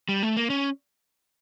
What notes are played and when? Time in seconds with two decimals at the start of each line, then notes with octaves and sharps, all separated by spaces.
0.09 G3
0.23 A3
0.37 A#3
0.50 C#4